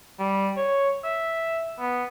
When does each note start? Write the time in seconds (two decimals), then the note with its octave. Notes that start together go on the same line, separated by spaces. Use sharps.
0.19 G3
0.57 C#5
1.04 E5
1.80 B3